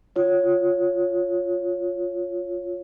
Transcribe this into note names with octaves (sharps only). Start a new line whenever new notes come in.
F4 C#5